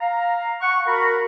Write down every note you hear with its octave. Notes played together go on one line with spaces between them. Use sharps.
F5 A#5
F#5 C#6
F#4 A#4 A#5 B5